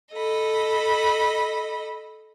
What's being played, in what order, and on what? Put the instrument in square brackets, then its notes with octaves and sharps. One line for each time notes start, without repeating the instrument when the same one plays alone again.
[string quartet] A4 D#5 B5